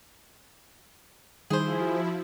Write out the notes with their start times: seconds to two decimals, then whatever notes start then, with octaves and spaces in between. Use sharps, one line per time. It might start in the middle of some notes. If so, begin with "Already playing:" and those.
1.50 D#3 F3 G3 D#4 E4 G#4 C5
1.80 F#4